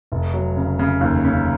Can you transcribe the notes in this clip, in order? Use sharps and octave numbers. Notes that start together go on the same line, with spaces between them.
F1
F#3
C#3
C#3
D#2
C#3